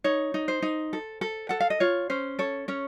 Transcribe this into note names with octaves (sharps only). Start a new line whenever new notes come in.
D#4 C#5
D#4
C5
D#4
A4
A4
A4 F#5
F5
D#5
F4 C#5
C#4 C5
A4 C#5
C#4 C#5